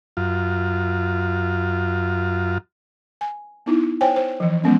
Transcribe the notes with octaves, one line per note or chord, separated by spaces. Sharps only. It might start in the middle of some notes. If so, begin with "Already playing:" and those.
F#2 F4
G#5
B3 D#4 E4
C5 C#5 G5 G#5
C5
E3 F3
F3 G#3 B3 C#4